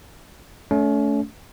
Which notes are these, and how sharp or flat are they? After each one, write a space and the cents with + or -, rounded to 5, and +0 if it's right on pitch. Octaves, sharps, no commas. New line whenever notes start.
A3 -15 C#4 +35